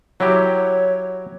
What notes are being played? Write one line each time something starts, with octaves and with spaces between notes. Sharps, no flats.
F#3 E4 G4 C#5